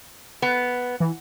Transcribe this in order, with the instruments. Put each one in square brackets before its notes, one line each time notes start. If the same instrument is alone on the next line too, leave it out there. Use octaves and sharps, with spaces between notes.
[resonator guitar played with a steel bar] B3
[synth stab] E3